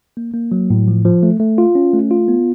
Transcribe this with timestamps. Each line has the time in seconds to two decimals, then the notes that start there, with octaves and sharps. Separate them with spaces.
0.17 A#3
0.34 A#3
0.52 F#3
0.70 A2
0.88 F3
1.05 F3
1.23 A3
1.40 A3
1.58 F4
1.75 C#4
1.93 A3
2.11 F4
2.28 B3